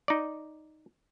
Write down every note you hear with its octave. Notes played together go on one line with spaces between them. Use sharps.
D#4 D5